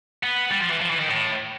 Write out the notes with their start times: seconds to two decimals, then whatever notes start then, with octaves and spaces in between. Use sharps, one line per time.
0.23 B3
0.51 G3
0.61 F3
0.70 E3
0.80 F3
0.90 E3
0.99 D#3
1.09 A2